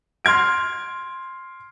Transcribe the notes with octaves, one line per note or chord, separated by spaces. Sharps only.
C6 F6 G#6 D7